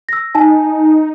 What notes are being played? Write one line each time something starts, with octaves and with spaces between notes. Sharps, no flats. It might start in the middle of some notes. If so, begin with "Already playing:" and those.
E6 A#6
D#4 G#5 A5